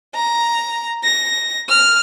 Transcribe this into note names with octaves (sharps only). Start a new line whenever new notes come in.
A#5
A#6
F6